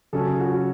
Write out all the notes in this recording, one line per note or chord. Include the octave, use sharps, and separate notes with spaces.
C#3 F#3 C#4 A4
F#4